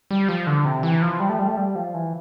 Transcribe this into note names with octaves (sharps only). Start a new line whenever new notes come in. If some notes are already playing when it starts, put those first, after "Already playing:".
G3
F3
D3
C3
E3
F3
G3
A3
G3
A3
G3
F3
E3